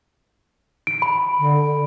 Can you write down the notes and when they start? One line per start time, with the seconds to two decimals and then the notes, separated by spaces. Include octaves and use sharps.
0.87 D7
1.02 B5
1.39 D3